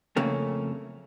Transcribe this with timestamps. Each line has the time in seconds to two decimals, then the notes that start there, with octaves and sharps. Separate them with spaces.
0.16 F2 C#3 A3 A#3 C#4